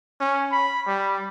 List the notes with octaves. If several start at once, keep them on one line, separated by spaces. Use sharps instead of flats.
C#4
B5
G3